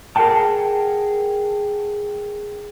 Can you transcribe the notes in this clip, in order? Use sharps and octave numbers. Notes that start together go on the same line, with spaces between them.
G#4 A#4 C5 F#5 G5 A5